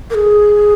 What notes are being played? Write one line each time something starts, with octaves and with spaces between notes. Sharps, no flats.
A#4
G#4